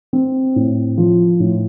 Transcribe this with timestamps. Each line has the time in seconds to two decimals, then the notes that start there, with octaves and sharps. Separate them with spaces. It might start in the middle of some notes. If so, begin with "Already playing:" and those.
0.13 C4
0.56 A2
0.97 F3
1.40 A2